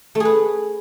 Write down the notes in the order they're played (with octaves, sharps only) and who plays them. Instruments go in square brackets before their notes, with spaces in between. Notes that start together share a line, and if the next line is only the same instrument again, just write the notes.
[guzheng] A3
G#4
B4